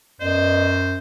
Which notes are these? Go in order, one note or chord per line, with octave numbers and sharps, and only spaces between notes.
F#2 B3 C5 D5 D#5